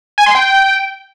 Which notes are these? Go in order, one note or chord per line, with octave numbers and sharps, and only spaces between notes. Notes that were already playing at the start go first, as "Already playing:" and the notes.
G#5
C6
G5